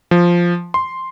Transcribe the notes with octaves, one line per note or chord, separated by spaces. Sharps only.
F3
C6